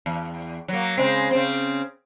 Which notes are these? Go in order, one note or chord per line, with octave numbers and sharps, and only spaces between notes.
E2
F#3 A#3
C#3 G#3 C4
C#3 C4